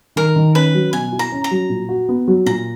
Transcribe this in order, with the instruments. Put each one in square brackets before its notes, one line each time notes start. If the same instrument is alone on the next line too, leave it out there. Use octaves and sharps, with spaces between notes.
[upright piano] D#3 [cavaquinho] A#4
[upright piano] D#3
[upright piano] C#4 [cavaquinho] B4
[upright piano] F#3
[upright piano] B2 [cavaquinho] G#5
[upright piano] E4
[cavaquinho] A#5
[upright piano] C#4
[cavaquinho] A#5
[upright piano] F#3
A#2
F#4
B3
F#3
[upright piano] A#2 [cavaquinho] A#5